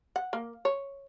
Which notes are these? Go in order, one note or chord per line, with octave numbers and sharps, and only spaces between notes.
F#5
A#3
C#5